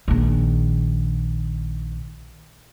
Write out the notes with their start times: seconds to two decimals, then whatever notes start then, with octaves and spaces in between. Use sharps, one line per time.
0.08 A#1 D#3